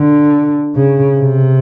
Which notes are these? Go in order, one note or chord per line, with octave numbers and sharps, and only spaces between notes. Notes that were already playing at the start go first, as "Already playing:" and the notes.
Already playing: D3
C#3
C3